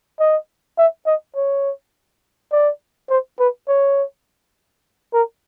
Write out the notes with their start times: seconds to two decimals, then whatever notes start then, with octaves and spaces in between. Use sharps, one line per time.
0.20 D#5
0.78 E5
1.06 D#5
1.36 C#5
2.52 D5
3.10 C5
3.40 B4
3.68 C#5
5.14 A#4